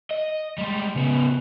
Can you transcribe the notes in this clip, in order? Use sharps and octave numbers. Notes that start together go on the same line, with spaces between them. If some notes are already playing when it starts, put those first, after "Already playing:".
D#5
G3 G#3
C#3 B3